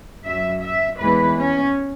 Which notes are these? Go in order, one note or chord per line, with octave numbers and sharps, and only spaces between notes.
F#2 F#3 E5
E5
E2 E3 G#3 B4
C#4